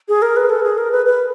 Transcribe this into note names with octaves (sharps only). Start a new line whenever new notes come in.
G#4
A#4
B4
A4
G#4
A#4
B4
B4